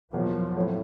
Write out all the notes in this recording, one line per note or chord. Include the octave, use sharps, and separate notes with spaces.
E2 B2 F3 F#3 A#3
A2 F#3 A3 C4 E4